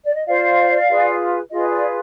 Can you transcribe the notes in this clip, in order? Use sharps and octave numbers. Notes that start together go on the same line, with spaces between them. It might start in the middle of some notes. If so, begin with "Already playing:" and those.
D5
D#5
F4 C5 D5 F5
F4 G#4 B4
F4 G#4 B4 D#5
D5